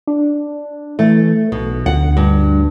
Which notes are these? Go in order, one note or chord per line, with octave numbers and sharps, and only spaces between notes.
D4
E3 A3
B1 B2
D2 F#5
G2